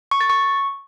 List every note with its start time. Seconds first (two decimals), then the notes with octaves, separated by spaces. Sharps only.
0.11 C#6
0.21 A6
0.30 C#6